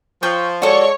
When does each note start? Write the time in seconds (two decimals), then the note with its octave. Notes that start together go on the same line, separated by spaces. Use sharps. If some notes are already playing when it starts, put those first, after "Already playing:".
0.23 F3 C#5 G5 C#6
0.62 G#3 F#4 A4 C#5 D5 C#6